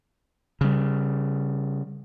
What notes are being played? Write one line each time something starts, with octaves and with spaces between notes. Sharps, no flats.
C#3 G3